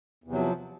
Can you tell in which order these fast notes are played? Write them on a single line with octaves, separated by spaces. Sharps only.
E2 C3 F#3 F3